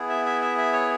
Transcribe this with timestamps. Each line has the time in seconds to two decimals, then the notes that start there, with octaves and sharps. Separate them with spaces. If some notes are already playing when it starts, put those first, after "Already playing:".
Already playing: B3 E4 G#4
0.10 E5
0.25 E5
0.42 E5
0.58 E5
0.73 C#5